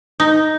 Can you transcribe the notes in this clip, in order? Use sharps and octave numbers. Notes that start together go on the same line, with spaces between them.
D#4